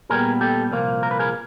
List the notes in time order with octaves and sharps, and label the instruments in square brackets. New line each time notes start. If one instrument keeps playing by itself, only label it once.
[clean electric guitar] A#2 G3 B3 G#4 A#4
G4 A4
C2 A#2 F3 A#3
A#4
B4
G#4 A#4